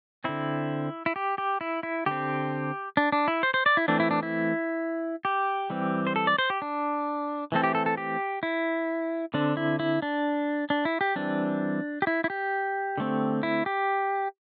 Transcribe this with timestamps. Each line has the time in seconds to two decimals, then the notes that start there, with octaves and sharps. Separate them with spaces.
0.24 D3 C4 E4
1.06 E4
1.16 G4
1.38 G4
1.61 E4
1.83 E4
2.06 D3 C4 G4
2.97 D4
3.12 D4
3.28 E4
3.43 C5
3.54 C5
3.66 D5
3.77 E4
3.88 E3 A3 C4 D4
4.00 E4
4.11 D4
4.23 E4
5.25 G4
5.70 E3 G3 C4
6.07 C5
6.16 A4
6.27 D5
6.38 C5
6.50 G4
6.62 D4
7.52 E3 A3 C4 A4
7.64 G4
7.75 A4
7.86 A4
7.97 G4
8.43 E4
9.34 D3 C4 D4
9.57 E4
9.79 E4
10.02 D4
10.70 D4
10.85 E4
11.01 G4
11.16 E3 G3 C4 D4
12.02 G4
12.07 E4
12.24 E4
12.30 G4
12.98 D3 A3 C4
13.43 E4
13.66 G4